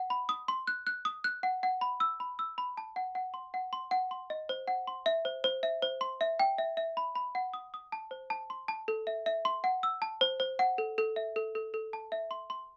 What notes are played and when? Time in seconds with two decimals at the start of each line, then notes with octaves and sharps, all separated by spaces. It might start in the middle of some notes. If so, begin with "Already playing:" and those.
Already playing: F#5
0.10 B5
0.29 D#6
0.48 C6
0.67 F#6
0.87 F#6
1.05 D#6
1.24 F#6
1.43 F#5
1.63 F#5
1.81 B5
2.00 E6
2.20 B5
2.39 E6
2.58 B5
2.77 A5
2.96 F#5
3.15 F#5
3.34 C6
3.54 F#5
3.73 C6
3.91 F#5
4.11 C6
4.30 D#5
4.49 C5
4.68 F#5
4.87 C6
5.06 E5
5.25 C5
5.44 C5
5.63 E5
5.82 C5
6.01 C6
6.21 E5
6.40 G5
6.58 E5
6.77 E5
6.97 B5
7.16 B5
7.35 F#5
7.54 D#6
7.74 D#6
7.92 A5
8.11 C5
8.30 A5
8.50 C6
8.68 A5
8.88 A4
9.07 E5
9.26 E5
9.45 C6
9.64 F#5
9.83 E6
10.02 A5
10.21 C5
10.40 C5
10.59 F#5
10.78 A4
10.98 A4
11.16 E5
11.36 A4
11.55 A4
11.74 A4
11.93 A5
12.12 E5
12.31 C6
12.50 C6